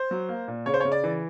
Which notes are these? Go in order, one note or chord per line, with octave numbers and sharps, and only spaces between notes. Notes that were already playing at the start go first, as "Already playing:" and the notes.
Already playing: C5
F#3
A#3
A#2
C#3 C#5
C5
C#5
C#3
D5
E3